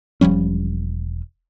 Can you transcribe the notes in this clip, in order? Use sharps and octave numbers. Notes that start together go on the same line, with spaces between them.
E1 F3 G3 C#4